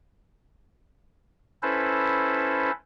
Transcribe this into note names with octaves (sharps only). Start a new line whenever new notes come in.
C#4 E4 A4 B4 C5